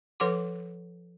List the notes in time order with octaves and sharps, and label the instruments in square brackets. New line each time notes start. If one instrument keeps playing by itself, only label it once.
[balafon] F3 A4 B4 F#5 C6 D6